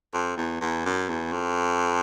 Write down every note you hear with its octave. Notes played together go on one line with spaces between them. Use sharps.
F2
E2
E2
F#2
E2
F2